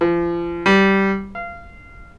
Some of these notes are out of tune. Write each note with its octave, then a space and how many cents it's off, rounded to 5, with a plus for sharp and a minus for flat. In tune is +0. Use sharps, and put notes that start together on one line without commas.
F3 -35
G3 -10
F5 -20